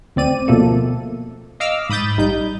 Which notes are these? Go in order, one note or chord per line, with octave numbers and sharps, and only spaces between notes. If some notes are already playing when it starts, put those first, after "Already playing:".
D2 C4 D5 D#7
B2 F3 A3 A#3 A4
D#5 F5 D6 E6 F6
G#2 B5 D#6 G6 A6
A#1 G3 D#4 G6